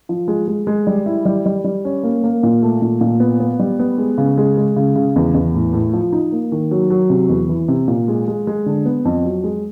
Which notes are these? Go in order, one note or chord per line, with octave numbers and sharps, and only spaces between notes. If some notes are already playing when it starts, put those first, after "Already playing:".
F3
G#3
G#3
G#3
G3
E4
G3
G3
G3
C#4
A#3
A#3
A#2
A3
A#2
A#2
B3
B3
G3
B3
G#3
C#3
G#3
G#3
C#3
C#3
E2
E2
A2
A2
F3
D#4
A#3
D#3
F#3
F#3
C3
E2
E3
C3
A#2
G#3
G#3
G#3
D3
B3
F2
F#3
G#3